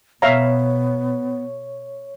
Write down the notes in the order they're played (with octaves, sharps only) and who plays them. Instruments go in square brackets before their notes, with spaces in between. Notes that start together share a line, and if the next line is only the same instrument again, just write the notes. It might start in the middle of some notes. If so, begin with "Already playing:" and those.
[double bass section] B2 [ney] B3 [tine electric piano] C#5 [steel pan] E5 F5 A#5